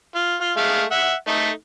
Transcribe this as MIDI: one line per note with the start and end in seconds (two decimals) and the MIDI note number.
0.15 0.35 65
0.41 0.52 65
0.57 0.83 56
0.57 0.83 57
0.57 0.83 77
0.91 1.13 76
0.91 1.13 78
1.27 1.49 57
1.27 1.49 63